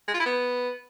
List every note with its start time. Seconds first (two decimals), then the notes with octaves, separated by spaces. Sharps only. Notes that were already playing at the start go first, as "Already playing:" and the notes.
0.08 G#3
0.14 F4
0.20 E4
0.26 B3